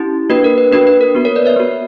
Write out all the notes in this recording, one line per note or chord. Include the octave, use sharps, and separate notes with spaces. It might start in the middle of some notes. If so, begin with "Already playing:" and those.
Already playing: C#4 E4 G4
A#3 D4 F#4 B4
A#4
B4
A#3 D4 F#4 B4
B4
A#4
B3 F#4
A#4 C#5
B4 D5
C#5 E5
B3 F#4